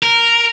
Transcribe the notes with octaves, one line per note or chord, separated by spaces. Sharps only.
A#4